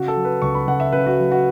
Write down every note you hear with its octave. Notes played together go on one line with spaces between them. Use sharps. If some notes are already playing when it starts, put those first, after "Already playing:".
Already playing: C#3 F#4
A4
F#3
B4
C#2 C#6
B5
C#2 F#5
E5
C#3 B4
F#4
F#3
F#4